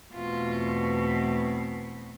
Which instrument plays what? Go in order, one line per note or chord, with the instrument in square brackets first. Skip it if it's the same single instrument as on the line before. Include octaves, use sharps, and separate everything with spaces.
[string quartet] E2 B2 A3 C4 F4